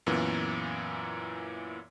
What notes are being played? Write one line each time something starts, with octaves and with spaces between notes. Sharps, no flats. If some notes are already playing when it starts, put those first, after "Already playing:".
F#2 A#2 E3 B3